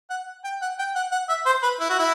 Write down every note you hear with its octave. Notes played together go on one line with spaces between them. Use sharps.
F#5
G5
F#5
G5
F#5
F#5
E5
C5
B4
E4
F#4
E4